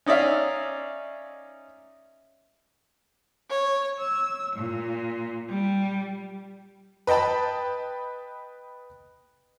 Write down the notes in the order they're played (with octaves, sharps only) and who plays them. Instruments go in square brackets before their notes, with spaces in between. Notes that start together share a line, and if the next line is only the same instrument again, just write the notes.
[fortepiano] C#4 D#4 D5 E5 F5
[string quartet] C#5
E6
A#2
G3
[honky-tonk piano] B4 D#5 G5 A5 B5